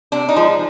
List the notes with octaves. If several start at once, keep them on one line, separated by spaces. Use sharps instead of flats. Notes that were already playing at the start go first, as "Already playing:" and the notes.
C3 D4
D#4
F3 G#3